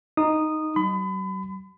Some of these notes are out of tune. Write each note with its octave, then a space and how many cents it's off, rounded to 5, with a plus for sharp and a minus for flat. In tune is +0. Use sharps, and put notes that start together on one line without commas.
D#4 +0 D#6 -10
F#3 +40 B5 +35